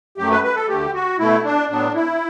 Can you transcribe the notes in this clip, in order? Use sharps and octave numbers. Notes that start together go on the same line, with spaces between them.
F#2 F#3 A3 G4
B4
B4
A4
D2 D3 A3 G4
F#4
B2 A3 E4
D4
A2 F#3 B3 D4
E4